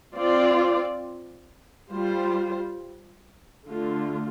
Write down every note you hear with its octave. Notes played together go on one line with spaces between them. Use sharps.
C4 F4 D5
G3 F4 C5
D3 A3 F4